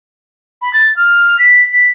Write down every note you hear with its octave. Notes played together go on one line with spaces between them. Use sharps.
B5
A6
F6
B6
B6